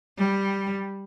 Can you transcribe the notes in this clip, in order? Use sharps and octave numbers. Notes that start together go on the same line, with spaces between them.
G3